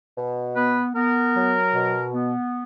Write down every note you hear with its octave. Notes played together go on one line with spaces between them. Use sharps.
B2
B3 B4
B3 A#4
F#3
B2
B3